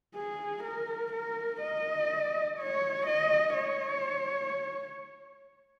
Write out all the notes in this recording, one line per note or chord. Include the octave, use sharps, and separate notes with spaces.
G#4
A#4
A#4
D#5
C#5
D#5
C#5